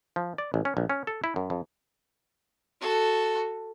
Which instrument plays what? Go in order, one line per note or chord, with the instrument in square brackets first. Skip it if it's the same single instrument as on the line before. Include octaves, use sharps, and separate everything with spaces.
[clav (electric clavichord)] F3
D5
A1
C#4
A#1
C#4
A4
E4
F#2
F2
[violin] F#4 A4